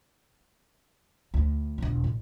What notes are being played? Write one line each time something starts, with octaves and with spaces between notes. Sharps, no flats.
D2
E1 B2
A1